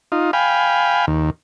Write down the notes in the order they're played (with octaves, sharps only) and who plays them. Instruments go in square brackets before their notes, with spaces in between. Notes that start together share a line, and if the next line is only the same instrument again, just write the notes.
[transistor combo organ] D#4 F4
F5 G5 G#5 B5
D#2